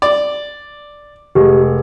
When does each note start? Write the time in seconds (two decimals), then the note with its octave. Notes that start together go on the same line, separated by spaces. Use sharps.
0.02 D5
1.35 F1 G#3 G4